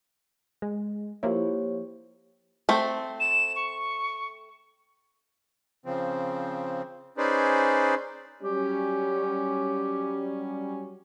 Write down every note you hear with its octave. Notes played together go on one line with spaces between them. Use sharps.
G#3
F3 A#3 E4 G4 C5 C#5
A3 C4 C5
E7
C#6
C#3 F3 C4
C#4 D#4 G#4 B4 C5 D5
F#3 G3 C#4 G4